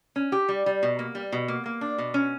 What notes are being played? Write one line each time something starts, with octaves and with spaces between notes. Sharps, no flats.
C#4
G4
G3
G3
B2
A#3
G3
B2
A#3
A#3
D4
B2
C#4